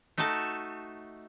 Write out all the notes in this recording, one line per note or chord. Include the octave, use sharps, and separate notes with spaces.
A3 D#4 F#4 A4 A5